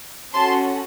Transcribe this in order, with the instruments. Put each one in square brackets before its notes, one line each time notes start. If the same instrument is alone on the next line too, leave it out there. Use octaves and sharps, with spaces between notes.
[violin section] C#4 F#4 A4 A5 C6